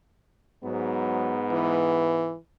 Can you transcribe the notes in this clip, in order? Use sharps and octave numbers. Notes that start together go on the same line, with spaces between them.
G#2 F#3 B3
E3